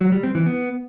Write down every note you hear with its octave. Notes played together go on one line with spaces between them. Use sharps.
F#3
G3
C4
E3
B3